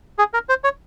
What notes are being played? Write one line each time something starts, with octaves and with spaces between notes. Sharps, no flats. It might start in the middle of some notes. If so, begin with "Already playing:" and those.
G#4
A#4
C5
C#5